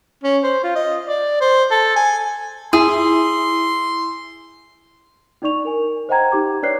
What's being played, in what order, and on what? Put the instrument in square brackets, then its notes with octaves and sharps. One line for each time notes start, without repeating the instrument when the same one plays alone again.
[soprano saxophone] C#4
C5
F4
D#5
D5
C5
A4
G#5
[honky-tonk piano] E4 [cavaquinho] G#4 [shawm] C6
[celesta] D4 D#4 D5 C#6 F7
A#4 G#5
C5 D#5 F#5 G5 A#5 G#6
D#4 G4 D6 G#6
D4 B4 C#5 D5 F#6 C7